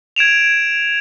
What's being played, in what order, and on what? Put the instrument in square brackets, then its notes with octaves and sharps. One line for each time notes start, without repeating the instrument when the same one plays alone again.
[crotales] G#6 D7 E7 F7